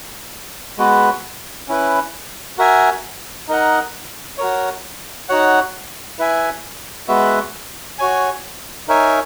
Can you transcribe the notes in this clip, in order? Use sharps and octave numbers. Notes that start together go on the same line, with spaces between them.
G#3 B3 F#4 B4
C#4 E4 B4
F#4 A#4 E5 G#5
D#4 A#4 D#5 F#5
F#4 A#4 C#5
D#4 F#4 C#5 F#5
E4 B4 E5 G#5
G#3 B3 F#4 B4 E5
F#4 C#5 G#5
D#4 A#4 C#5 E5 G#5